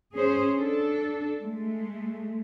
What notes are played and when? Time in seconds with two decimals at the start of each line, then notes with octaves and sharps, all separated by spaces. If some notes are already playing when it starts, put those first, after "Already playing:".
0.16 C#4 G#4 C5
0.54 D4 A4
1.41 G#3 A3